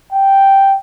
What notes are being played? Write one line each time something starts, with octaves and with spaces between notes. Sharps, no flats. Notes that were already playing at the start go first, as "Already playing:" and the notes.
G5